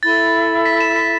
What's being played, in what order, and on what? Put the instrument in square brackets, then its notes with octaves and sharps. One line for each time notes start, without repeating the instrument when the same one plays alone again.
[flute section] E4 A4 E5 B5 [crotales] A6
[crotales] B6
E7
B6